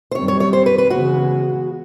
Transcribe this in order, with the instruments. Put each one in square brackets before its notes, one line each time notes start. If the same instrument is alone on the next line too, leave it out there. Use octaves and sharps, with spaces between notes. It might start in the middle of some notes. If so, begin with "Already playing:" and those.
[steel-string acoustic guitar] C5
[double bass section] F#2 D#3 G3 C4 [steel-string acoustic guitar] C#5
[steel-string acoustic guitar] C#5
C#5
C5
B4
B4
[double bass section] C#3 E3 G#3 B3 [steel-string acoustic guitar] F#4